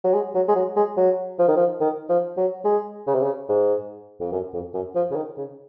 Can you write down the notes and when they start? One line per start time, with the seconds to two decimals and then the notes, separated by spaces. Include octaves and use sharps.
0.04 F#3
0.14 G#3
0.34 F#3
0.48 G#3
0.56 F#3
0.76 G#3
0.97 F#3
1.39 F3
1.48 D#3
1.57 F3
1.81 D#3
2.09 F3
2.37 F#3
2.64 G#3
3.07 C#3
3.15 C3
3.23 C#3
3.49 G#2
4.20 F2
4.32 F#2
4.53 F2
4.74 F#2
4.95 F3
5.11 C#3
5.16 D#3
5.37 C#3